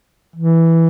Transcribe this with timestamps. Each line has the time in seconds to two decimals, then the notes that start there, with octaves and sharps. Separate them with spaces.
0.36 E3